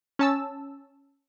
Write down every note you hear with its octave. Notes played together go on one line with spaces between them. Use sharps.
C#4 A5 E6